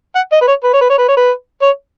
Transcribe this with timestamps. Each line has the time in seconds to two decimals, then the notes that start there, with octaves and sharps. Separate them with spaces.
0.15 F#5
0.32 D#5
0.41 B4
0.48 C#5
0.64 B4
0.73 C#5
0.81 B4
0.90 C#5
0.98 B4
1.08 C#5
1.17 B4
1.61 C#5